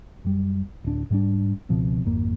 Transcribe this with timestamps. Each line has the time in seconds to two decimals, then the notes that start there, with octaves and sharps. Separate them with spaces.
0.25 F#2 G3
0.84 D1 D4
1.10 G#2 G3 D4
1.69 C#2 B2 F3 C4
2.04 G#1 F2 A#3